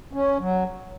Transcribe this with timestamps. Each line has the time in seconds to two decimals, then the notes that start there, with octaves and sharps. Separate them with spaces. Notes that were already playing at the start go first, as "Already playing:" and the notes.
0.13 C#4
0.39 F#3